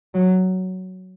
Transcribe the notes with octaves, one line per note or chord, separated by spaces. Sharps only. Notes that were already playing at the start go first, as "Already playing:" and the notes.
F#3